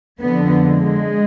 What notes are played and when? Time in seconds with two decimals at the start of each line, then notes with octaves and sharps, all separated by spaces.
0.21 F2 D3 F3 B3
0.66 G#3